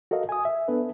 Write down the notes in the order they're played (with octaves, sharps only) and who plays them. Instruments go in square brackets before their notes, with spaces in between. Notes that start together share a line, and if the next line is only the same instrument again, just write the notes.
[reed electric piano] F#4 A4 A#4 D#5 F5
G#5 D#6
E5
B3 D4 A4 B4